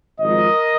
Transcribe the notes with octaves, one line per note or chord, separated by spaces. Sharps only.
G#1 G#2 F3 A#4 D#5